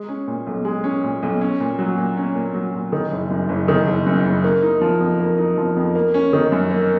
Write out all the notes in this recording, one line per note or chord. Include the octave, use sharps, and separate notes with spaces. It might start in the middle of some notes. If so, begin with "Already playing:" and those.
Already playing: G#3
C#4
A#2
B1
G#3
C#4
A#2
B1
C#4
A#2
F#3
A#2
C#4
A#2
F#3
A#2
D#3
F#1
F#2
F#1
D#3
F#1
F#2
F#1
A#3
D#4
F3
F2
A#3
D#4
F3
F2
A#3
C#4
D#3
F#2
A#3